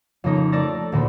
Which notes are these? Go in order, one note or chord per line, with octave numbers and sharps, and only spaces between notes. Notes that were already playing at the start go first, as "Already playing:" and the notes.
F2 C#3 A#3 D#4 A#5
A3 A#4 D5 E6 A6 A#6
D2 A#2 C4 B5